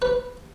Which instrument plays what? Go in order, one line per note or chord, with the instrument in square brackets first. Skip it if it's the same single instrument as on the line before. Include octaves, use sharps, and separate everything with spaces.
[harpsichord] B4